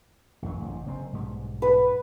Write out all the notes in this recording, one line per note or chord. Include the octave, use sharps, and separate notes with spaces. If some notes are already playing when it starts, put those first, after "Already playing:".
A1 F#2 F#3
A1 C3
F#1 F#2 C4
B1 G#2 G3
B4